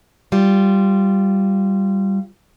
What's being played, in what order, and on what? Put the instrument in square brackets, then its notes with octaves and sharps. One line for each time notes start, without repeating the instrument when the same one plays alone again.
[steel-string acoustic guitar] G3 F4